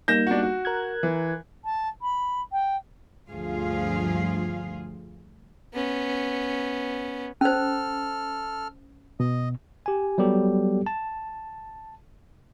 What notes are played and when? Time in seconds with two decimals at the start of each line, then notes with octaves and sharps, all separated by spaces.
0.08 G3 A#3 D#4 G6 A#6 E7
0.27 D4 F#4
0.43 F#4
0.65 A#4 F#6 G#6
1.03 E3
1.64 A5
2.01 B5
2.52 G5
3.29 D2 G2 F3 F4 G#4 F5
5.74 B3 C#4
7.41 C#4 A4 C5 F6
9.20 B2 D#5
9.86 G4 G#5
10.18 F#3 G3 B3 G4 A4
10.86 A5